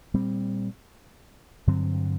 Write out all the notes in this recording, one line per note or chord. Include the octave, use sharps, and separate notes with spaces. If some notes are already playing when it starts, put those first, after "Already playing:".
A#2 G3 C4
G2 D3 F#3 C4